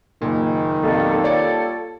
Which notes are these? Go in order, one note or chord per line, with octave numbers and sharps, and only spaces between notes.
F#1 A#2 D#3
B1 F2 G3 A#3 A4
F4 C#5 D5